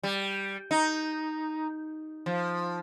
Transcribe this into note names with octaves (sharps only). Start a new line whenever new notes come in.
G3
D#4
F3